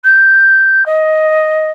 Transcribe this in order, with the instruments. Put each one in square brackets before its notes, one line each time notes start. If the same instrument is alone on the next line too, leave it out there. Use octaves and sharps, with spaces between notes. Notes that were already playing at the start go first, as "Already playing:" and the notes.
[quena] G6
D#5